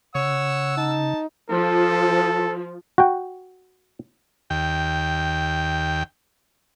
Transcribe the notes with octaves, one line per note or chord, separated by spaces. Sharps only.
C#3 C#5 F#5 E6
D#4 A5
F3 A4
F#4 G5
D#2 G5